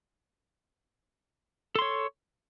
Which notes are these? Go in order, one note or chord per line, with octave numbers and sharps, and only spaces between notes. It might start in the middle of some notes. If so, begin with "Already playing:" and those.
A4 C#5 C6